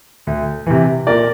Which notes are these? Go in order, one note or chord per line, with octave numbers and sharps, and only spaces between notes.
D2
C3 E3
A#2 A#4 D5